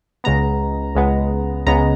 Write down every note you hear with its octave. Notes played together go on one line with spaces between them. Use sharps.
C#2 C#3 G#3 B3 A#5
C#2 C#3 G#3 B3
C#2 C#3 G#3 B3 A#5